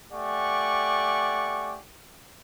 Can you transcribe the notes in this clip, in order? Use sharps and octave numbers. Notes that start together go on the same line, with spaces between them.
A3 G4 D5 F#5 G#5 C#6